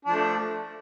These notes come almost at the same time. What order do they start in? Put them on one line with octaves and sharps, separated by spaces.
D4 F3 A3